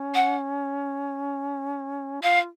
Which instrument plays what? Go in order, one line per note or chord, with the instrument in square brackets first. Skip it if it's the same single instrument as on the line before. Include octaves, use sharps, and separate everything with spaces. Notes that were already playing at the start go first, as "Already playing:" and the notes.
Already playing: [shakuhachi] C#4
[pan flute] F#5
[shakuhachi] F4 [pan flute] F5